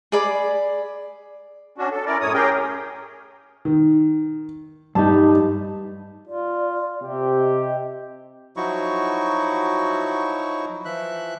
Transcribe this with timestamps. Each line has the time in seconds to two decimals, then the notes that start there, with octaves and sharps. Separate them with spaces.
0.12 G#4 D5 B5
1.78 C#4 D4 F#4
1.92 A4
2.06 C#4 E4 A#4 D5
2.21 F#2 A2 C#5 D#6
2.34 C#4 G4 G#4 A#4 G5
3.65 D#3
4.95 G2 G3 D#4 A5
6.28 F4 D5
7.02 C3 C4 G4
7.37 D#5
8.57 F3 F#3 D#4 E4 F#4 C#6
10.85 E3 F3 E5 F#6